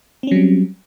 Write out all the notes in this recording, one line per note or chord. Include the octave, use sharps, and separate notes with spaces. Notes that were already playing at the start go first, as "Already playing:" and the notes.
F#3 G3 C4 C#4